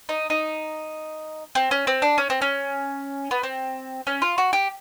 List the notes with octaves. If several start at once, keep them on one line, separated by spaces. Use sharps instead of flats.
D#4
D#4
C4
C#4
C4
D4
C#4
C4
C#4
B3
C4
C#4
F4
F#4
G4